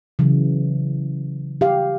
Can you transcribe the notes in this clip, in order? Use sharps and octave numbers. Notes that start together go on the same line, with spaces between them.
C#3 E3 F#3
G4 F5